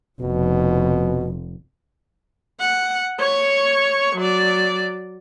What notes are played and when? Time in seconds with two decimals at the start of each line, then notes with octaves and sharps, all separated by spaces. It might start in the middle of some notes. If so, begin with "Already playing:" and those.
0.21 F1 B2
2.60 F#5
3.19 C#5 C#6
4.16 F#3 D5